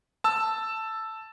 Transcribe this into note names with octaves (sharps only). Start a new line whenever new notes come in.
A5 E6